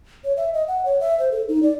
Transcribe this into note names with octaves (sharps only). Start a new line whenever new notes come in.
C#5
E5
D#5
F#5
C#5
E5
C5
A4
D#4
D5